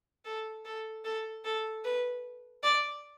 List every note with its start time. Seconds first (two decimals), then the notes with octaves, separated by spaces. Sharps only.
0.25 A4
0.65 A4
1.05 A4
1.44 A4
1.85 B4
2.63 D5